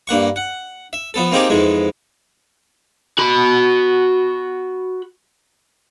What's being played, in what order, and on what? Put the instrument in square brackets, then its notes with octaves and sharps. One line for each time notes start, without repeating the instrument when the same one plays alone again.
[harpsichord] G2 A#3 F#5 C#6
F#5
E5
F3 B3 A4
A#3 C4 D#4 F4 G4 G#4
F2 G#2 E3 G#3
[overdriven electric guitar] F#4 B5